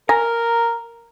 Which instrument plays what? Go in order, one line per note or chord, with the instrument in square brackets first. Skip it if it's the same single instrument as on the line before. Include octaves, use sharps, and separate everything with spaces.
[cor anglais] A#4 [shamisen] G#5 [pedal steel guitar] A#5